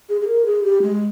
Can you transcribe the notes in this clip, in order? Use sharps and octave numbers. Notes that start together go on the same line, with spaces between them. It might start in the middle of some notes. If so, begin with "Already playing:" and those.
G#4
G#4
A#4
G#4
G4
G#3